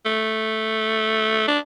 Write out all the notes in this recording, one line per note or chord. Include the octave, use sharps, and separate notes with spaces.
A3
D4